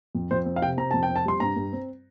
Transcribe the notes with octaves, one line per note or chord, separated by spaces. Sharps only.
F2
F2 C5
C4
F5
C3 G5
C4 A#5
F2 A5
G5
C4
A5
G3 C6
G2 A#5
G2
C4